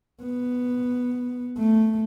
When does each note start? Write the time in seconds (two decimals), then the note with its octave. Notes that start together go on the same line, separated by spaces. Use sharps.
0.23 B3
1.58 A3